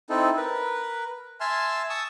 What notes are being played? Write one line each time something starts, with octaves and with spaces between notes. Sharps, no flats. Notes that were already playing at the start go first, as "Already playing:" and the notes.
C4 D#4 E4 A4
A#4 B4
E5 G#5 A5 C6 F6
A5 C#6 D#6 E6